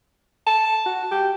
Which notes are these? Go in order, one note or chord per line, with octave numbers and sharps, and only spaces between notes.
A5
F#4
G4